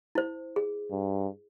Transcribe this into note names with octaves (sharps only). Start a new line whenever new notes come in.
E4 C5
G#4
G2